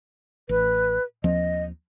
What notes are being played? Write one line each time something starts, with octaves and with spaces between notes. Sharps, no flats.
A1 B4
D#2 F3 C4 D#5